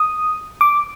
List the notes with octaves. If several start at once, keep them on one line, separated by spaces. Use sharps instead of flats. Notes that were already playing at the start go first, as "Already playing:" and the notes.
Already playing: D#6
D6